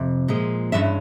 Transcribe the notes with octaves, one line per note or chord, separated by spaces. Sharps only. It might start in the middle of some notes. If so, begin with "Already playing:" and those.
Already playing: F2 C3
A#2 F3 G#3
G2 E3 G#3 C#4 E5